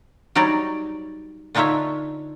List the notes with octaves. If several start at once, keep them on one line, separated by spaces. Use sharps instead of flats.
F#3 G3 D#4 C#5 D5
D3 D4 D#4 F4 C#5 E5